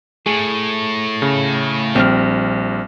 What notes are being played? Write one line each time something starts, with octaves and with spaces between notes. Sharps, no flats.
A2 G#4
C#3
A#1 G3 C4 F6